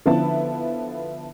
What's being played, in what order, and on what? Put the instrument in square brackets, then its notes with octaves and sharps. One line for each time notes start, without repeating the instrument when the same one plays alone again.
[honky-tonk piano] D3 F3 B3 E4 A5